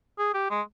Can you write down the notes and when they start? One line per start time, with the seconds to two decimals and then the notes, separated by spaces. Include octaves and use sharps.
0.19 G#4
0.34 G4
0.50 G#3